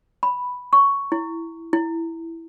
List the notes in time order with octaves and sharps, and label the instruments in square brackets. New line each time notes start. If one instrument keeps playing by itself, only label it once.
[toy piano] B5
C#6
E4
E4